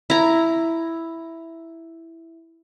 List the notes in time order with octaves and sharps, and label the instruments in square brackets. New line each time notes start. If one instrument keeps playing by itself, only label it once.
[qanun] E4 A#5